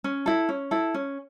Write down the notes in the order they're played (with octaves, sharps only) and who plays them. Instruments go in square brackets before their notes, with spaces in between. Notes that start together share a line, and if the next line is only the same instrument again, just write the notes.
[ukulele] C#4
E4 A4
C#4
E4 A4
C#4